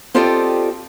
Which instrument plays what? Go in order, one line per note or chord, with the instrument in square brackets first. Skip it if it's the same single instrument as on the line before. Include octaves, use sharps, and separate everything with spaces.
[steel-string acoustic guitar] C4 F4 G4 A4 D5 D#5